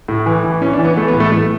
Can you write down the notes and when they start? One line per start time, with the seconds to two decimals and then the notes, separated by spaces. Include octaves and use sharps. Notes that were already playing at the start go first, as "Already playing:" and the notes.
0.08 A2
0.26 E3
0.44 E3
0.62 E3 C#4
0.73 D4
0.79 E3
0.84 B3
0.97 E3 A3
1.08 B3
1.14 A2
1.20 A3
1.32 A2 A3